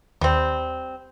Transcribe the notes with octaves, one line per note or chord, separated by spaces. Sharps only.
D#2 G3 C4